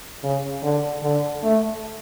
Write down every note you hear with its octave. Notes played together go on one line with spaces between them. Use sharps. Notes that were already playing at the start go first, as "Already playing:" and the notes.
C#3
D3
D3
A3